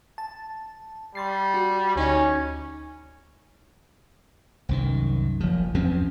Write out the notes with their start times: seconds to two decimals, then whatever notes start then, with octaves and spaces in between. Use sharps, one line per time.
0.18 A5
1.15 G3 C6 A6 C7
1.54 F#4
1.96 D2 C#4 D#4
4.69 C2 F#2 D#3
5.40 F#1 F3
5.75 E2 F3 C4 C#4